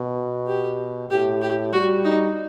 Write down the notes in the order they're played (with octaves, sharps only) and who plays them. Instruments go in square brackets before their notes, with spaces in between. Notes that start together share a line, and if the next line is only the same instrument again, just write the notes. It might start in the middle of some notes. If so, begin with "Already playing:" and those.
Already playing: [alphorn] B2
[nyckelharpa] G4
[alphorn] A2 [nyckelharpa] G4
[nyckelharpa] G4
[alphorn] G3 [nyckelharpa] F#4
[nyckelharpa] D#4